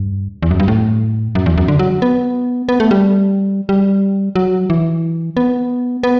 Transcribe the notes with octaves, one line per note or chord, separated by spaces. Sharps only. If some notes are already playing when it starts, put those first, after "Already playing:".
Already playing: G2
E2
F#2
G2
A2
F#2
E2
F#2
D3
F#3
B3
B3
A3
G3
G3
F#3
E3
B3
B3